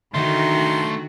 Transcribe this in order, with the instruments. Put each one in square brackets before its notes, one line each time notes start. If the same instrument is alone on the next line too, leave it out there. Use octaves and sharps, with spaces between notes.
[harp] D3 [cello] D#3 F#4 [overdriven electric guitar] A3 D#4 [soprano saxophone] C6